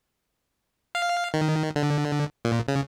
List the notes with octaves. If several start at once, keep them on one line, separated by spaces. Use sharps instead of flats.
F5
D#3
D3
A#2
C#3